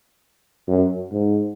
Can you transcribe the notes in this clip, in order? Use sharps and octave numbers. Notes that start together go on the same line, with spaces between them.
F#2
G#2